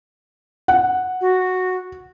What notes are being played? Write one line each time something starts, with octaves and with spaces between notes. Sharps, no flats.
F#5
F#4